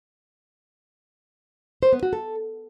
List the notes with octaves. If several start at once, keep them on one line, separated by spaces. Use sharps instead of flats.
C5
B3
F#4
A4